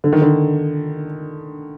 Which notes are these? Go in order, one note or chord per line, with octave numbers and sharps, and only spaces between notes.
D3
D#3
D3